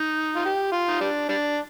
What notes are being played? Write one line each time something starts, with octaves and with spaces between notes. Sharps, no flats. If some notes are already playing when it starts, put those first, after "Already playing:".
Already playing: D#4
F4
G4
F4
D#4
G3 D4
G3 D4